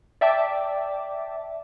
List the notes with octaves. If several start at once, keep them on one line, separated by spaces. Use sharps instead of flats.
D5 E5 G5 A5 D6